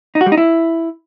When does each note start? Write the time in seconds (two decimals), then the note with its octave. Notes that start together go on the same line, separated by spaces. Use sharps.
0.15 D#4
0.21 F#4
0.26 G3
0.32 D#4
0.37 E4